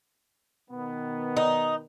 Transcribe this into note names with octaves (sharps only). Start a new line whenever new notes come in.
B2 D#3 B3
D#4